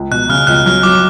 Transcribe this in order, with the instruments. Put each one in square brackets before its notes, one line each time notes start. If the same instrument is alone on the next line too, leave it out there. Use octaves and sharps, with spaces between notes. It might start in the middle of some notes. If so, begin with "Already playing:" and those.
Already playing: [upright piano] C#2
[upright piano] B2 [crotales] F#6
[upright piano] C#3 [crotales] F6
[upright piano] C#2 [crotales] F#6
[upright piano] F#3 [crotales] F6
[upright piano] F#3 [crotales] D6